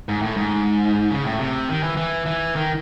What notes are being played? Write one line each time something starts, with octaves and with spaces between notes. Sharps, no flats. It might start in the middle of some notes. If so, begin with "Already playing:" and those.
G#2
A2
G#2
C#3
A2
C3
D#3
E3
E3
E3
D#3